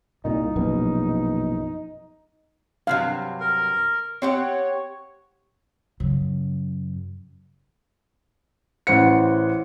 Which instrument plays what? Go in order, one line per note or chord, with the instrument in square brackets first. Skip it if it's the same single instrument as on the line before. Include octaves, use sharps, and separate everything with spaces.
[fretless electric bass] C2 A#2 [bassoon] D#4
[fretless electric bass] A#1 F#2 B2
[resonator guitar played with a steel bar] G2 C3 F#3 [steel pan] F5
[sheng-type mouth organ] A#4
[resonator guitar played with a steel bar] C4 G4 F#5 [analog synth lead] C#5
[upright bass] F#2 C#3
[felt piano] A1 C5 F#5 C#7